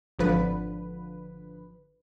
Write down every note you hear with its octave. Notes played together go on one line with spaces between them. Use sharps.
G#1 D3 F3 B4